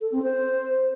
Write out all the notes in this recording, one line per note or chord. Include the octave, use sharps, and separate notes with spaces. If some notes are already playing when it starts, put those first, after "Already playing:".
A4
C4
C5